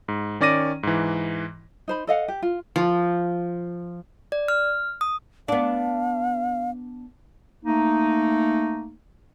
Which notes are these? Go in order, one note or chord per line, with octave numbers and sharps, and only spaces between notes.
G#2
D#3 C#4 D5 D6 A#6 D#7
G#2 E3
D#4 C5 B5
A4 D#5 F5 F#5
G4
F4
F3
D5
F6
D#6
B3 D4 F5
A3 A#3 D#4